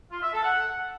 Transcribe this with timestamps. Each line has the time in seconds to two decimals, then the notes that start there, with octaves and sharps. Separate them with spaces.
0.12 F4
0.22 E5
0.33 A4
0.44 F#5